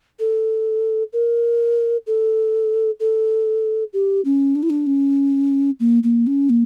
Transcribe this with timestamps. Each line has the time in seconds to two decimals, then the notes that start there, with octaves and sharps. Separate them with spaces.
0.19 A4
1.13 A#4
2.07 A4
3.00 A4
3.93 G4
4.25 C#4
4.55 D4
4.63 E4
4.70 D4
4.87 C#4
5.80 A#3
6.03 A#3
6.27 C#4
6.50 A#3